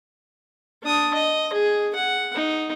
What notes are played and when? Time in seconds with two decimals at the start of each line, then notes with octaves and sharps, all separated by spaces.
0.83 D4 D#6
1.14 D#5
1.53 G#4
1.95 F#5
2.35 D#4